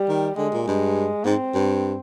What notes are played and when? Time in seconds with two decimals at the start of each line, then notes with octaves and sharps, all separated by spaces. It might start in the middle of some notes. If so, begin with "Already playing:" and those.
Already playing: G3
0.09 D#3
0.37 D3 G#3
0.53 A#2
0.67 G2 G#3
1.25 G#2 C4
1.54 G2